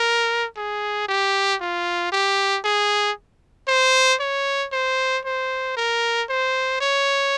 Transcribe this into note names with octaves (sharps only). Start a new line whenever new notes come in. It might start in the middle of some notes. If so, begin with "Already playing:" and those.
Already playing: A#4
G#4
G4
F4
G4
G#4
C5
C#5
C5
C5
A#4
C5
C#5